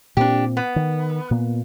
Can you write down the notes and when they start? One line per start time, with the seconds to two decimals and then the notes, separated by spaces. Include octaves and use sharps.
0.17 A#2 A#3 C4 D4 G4
0.57 B3
0.76 D#3
1.31 A#2 A#3 B3